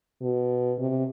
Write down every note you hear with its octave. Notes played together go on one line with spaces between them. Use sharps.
B2
C3